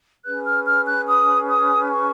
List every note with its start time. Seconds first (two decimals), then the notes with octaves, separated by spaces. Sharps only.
0.25 C#4 G#4 B4 F#6
0.45 F6
0.66 F6
0.87 F#6
1.07 D#6
1.49 D#6
1.90 C#6